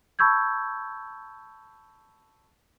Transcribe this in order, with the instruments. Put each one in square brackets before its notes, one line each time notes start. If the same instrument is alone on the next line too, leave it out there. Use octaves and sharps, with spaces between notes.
[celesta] A5 B5 C#6 E6 G6 G#6